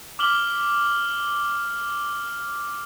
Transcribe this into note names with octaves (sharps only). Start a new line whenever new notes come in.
D6 F6 F#7 G7